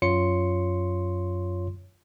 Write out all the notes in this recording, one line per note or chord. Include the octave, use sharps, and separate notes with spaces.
F#2 F4 C#5 C6 C#7